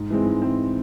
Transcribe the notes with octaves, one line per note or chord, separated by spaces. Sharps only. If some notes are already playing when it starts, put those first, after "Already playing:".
Already playing: G#2
E3 G#3 C4
G#2
E3 G#3 C4